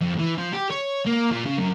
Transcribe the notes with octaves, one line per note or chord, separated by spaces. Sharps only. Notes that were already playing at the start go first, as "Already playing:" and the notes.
F2
E3
F3
G4
C#5
A#3
A#2
C#3
F#2